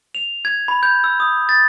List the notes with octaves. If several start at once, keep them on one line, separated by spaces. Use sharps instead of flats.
F7
G#6
B5
G6
E6
D#6
A6